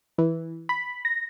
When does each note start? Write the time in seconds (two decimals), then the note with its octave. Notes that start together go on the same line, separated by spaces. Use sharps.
0.18 E3
0.69 B5
1.05 A#6